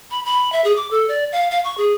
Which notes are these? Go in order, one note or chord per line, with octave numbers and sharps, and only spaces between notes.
B5
B5
E5
G#4
D6
A4
D5
F5
F5
C#6
G#4